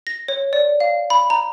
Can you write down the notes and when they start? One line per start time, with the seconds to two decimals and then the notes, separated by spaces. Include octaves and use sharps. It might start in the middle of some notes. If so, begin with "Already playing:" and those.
0.07 A#6
0.28 C#5
0.53 D5
0.80 F5
1.10 B5
1.30 A#5